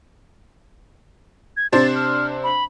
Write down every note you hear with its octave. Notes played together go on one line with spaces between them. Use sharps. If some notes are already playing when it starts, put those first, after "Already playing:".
G#6
C3 D4 C5 A6
F6
B5